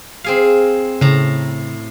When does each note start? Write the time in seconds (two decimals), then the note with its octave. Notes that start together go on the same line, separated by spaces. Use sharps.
0.24 C4 G#4 F5
1.01 A2 C#3 C4 A#5